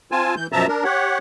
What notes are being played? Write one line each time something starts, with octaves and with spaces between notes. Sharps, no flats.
C4 F4 G#5 A5
E3 G6
F#2 B2 F3 E5 A5 A#5
D4 A#4
G4 C#5 F#5